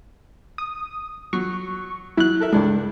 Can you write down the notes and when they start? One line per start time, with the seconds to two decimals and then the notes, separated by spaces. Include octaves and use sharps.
0.58 D#6
1.33 F#3 C#6
2.17 F#3 E4 F#6
2.40 A4 A#4 E5
2.52 C#2 G2 G#3 D4